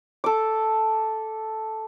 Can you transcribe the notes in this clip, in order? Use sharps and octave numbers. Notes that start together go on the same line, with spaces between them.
A4 D6